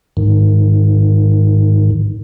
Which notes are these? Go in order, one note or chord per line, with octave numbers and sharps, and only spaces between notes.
G#2 D#3